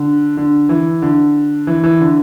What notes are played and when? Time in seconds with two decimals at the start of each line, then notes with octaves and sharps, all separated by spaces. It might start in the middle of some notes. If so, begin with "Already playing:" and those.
Already playing: D3
0.37 D3
0.69 E3
1.02 D3
1.67 E3
1.84 E3
2.01 D3